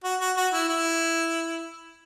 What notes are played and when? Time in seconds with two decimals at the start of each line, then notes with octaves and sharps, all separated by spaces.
0.04 F#4
0.20 F#4
0.37 F#4
0.53 E4
0.69 E4